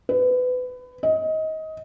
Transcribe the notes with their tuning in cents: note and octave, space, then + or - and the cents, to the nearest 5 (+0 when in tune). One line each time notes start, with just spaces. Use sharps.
B4 +25
D#5 +20